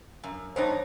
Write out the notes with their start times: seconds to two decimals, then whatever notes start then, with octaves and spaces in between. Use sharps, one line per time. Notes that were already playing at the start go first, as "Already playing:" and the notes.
0.23 F#2
0.56 E2 G2 D#4 C5 C#5 A5